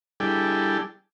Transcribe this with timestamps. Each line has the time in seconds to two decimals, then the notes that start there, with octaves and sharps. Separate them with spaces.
0.20 G3 D4 E4 G#4 A4 G5